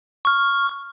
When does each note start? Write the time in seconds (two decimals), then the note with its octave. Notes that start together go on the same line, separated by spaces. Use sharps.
0.25 C#6 F6